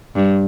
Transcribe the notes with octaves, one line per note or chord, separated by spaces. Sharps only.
G2